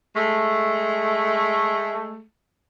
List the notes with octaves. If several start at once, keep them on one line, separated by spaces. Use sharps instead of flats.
G#3 A3